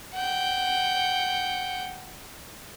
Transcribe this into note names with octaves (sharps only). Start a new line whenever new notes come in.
F#5 G5